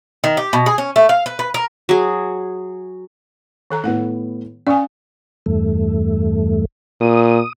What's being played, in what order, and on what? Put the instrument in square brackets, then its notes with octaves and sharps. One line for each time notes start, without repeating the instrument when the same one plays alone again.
[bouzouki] D#3
G4
B2
G#4
C#4
A3
F5
B4
B4
A#4
[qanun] F#3 G#4
[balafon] D#3 A4 A#5
[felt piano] A2 B3 [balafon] A4 F#5
[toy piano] C#4 [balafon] D5 G#5 [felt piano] F5 C#6 D#6
[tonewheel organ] E2 G2 A3
[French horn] A#2 [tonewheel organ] D#6